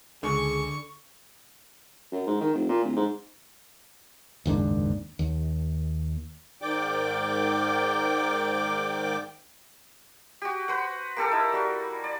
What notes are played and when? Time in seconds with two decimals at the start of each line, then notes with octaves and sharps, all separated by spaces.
0.23 C#2 D3 G#4 C#6
2.12 F#2
2.27 G#2
2.41 D#3
2.55 F1
2.69 A#2
2.84 D1
2.96 G#2
4.46 F#1 D#2 G#2 D4
5.19 D#2
6.61 G#2 D#3 D5 G5 D6
10.42 F#4 G4
10.68 B4 C5 F#5
11.16 A#3 G4 A4 A#4
11.31 D#4 E4
11.53 G3 F#4
12.04 D5